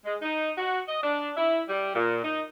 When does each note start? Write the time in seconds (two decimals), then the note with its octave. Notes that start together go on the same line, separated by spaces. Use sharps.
0.04 G#3
0.22 D#4
0.58 F#4
0.89 D#5
1.04 D4
1.37 E4
1.69 G3
1.95 A#2
2.22 D#4